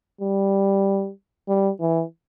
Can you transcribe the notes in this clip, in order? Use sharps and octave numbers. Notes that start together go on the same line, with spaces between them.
G3
G3
E3